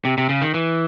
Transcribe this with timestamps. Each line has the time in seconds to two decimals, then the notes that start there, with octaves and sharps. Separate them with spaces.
0.05 C3
0.18 C3
0.29 C#3
0.42 D#3
0.54 E3